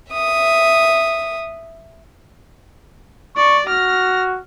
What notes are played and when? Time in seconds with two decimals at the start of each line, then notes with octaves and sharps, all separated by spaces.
0.12 E5 D#6
3.37 D5 C#6
3.68 F#4 F6 A#6